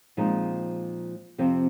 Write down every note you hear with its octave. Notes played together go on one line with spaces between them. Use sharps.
A#2 F3 G#3 C4 D#4
F2 C3 F3 C4